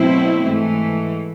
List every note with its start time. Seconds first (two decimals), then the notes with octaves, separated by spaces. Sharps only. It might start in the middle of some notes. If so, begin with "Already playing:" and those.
Already playing: B2 F#3 A3 C4 E4
0.45 G#2 E3 A3